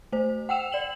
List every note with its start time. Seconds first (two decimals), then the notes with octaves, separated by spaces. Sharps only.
0.12 A3 C5
0.49 F#5 G5 E6 E7 F7
0.72 D5 E7 F#7